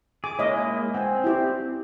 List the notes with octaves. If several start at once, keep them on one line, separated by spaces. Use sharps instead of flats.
G#4 D6
G#3 A#3 E4 C#5 D#5
C4 F#5 G#5
E4 G4